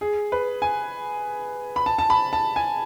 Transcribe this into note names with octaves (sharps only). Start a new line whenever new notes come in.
G#4
B4
G#5
B5
A5
A5
B5
A5
G#5